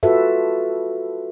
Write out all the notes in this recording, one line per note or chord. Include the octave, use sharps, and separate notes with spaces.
F4 F#4 A4 B4 E5